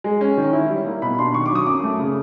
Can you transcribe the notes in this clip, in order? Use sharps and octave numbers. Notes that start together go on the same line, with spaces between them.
G#3
C#4
D#3
E4
G3
A#3
B2 B5
D4 C6
D#3 C#6
D6
F#3 D#6
F#2 D6
A3
C#3